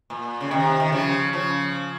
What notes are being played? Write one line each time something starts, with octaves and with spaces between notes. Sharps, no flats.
A#2
C#3
C3 D#3
D#3
C#3 F3
C#3 F3